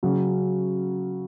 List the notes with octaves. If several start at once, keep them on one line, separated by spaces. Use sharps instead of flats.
C#3 F#3 C#4